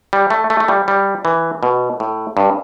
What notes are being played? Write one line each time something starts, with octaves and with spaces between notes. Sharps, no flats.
G3
A3
A3
A3
G3
G3
E3
B2
A2
G2